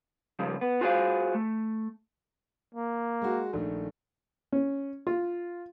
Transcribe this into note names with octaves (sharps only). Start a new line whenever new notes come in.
C#3 F3 G3
B3
F4 F#4 G#4 C5 D5 F5
A3
A#3
G#3 F#4
A#1 D#3 A3
C#4
F4